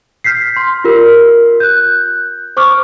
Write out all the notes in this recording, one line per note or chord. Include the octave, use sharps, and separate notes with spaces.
F6 G6 B6 C7
C6
F4 G4 A#4
F#6 G6
C5 C#6 D6 F6